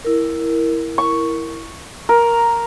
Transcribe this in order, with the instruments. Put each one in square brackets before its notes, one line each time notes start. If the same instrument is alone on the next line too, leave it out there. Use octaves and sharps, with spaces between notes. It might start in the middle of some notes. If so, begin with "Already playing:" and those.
[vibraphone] E4 A#4
[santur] C#6
[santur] A#4 [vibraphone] A#5